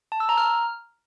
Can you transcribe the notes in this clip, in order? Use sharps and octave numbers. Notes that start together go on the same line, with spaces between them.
A5
E6
A#5
F6